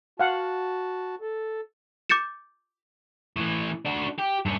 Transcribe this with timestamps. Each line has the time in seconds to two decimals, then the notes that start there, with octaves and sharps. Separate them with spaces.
0.20 F#4 F5 F#5 A5
1.21 A4
2.09 D6 G6 A6 C#7 E7
3.37 A2 E3
3.85 D4 F#4
4.18 G4
4.45 G2 C#4